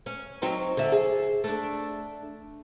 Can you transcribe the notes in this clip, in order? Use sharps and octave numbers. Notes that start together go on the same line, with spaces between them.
C#4
F#3 C4 D#4
D3 E5
G#4
A3 D4